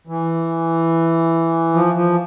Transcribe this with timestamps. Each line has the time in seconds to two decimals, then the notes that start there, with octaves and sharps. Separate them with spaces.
0.07 E3
1.74 F3
1.94 F3